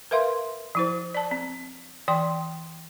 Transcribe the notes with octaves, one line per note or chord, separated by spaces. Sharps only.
A#4 B4 E5 F5 C6
F3 E4 C5
D5 A5
C4
E3 D5 G5 C6